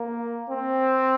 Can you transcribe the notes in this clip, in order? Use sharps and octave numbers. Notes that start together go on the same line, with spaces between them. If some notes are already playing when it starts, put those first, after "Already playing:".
Already playing: A#3
C4